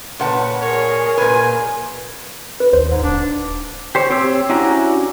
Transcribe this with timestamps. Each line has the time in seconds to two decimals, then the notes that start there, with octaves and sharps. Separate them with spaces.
0.19 A#2 B4 C#5 F#5 A5
0.62 G#4 A#4 C#5
1.17 A#2 B4 G#5
2.60 B4
2.73 D#2 C5
2.91 G#2
3.03 D1 D4
3.95 G4 C5 C#5
4.10 C4 G4 C#5 E6
4.50 C#4 D4 E4 F#4 A#5